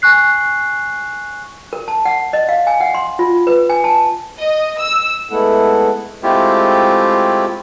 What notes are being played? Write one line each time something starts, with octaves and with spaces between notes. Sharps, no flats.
G#5 C#6 F#6 C7
A#4
A5
F#5
D#5
F5
G#5
F#5
C6
F4
B4
G#5
A5
D#5
E6
G#3 A3 B3 E4 A4 F#5
G#3 A3 C4 E4 F4 G4